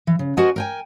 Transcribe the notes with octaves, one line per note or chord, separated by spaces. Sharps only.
E3
C#3
F#4 A#4 C5 D#5 F#5 G#5
A#4 G5 G#5